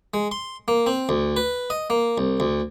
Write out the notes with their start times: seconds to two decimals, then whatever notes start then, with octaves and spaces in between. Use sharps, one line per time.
0.14 G#3
0.31 C6
0.68 A#3
0.86 C4
1.09 D2
1.36 B4
1.70 D#5
1.90 A#3
2.18 C2
2.40 D2